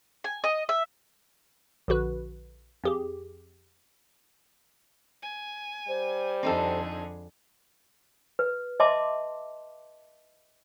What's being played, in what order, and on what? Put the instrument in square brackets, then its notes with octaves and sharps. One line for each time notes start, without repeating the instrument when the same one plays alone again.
[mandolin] G#5
D#5
E5
[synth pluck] A#1 D3 F#4 B4
F2 G4 G#4
[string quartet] G#5
[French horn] G3 [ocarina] C5
[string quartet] F2 D3 G#4 [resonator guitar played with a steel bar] C4 D#4 A4
[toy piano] B4
D#5 E5 A5 C6 D6